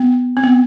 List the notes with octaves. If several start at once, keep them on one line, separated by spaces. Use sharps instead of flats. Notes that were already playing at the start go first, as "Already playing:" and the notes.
Already playing: B3
C4
B3